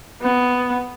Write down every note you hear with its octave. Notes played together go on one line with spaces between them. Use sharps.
B3